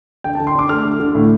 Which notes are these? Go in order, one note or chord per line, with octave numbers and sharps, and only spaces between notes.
D3 G5
A5
D3
C6
D4 D6
A3 F6
D3
D3
A2